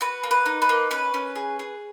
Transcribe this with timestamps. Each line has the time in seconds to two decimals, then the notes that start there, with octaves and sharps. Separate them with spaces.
0.01 F#4 B4
0.23 A#3
0.31 B4
0.46 D#4
0.62 B4
0.69 A#3
0.91 C#4 B4
1.14 C#4
1.36 G#4
1.59 G#4